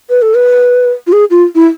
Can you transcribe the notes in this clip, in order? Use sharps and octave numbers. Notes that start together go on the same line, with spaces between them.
B4
A4
B4
F4
G#4
F4
E4